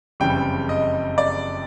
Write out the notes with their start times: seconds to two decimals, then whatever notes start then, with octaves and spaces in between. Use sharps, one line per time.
0.20 F#1 F2 C#3 E3 G3 G5
0.69 D#5
1.18 D5